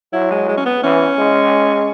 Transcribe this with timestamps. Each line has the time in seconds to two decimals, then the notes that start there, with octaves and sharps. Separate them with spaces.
0.13 F#3 E4
0.31 G#3
0.48 G#3
0.58 C#4
0.66 B3
0.83 E3 C#4
1.19 G#3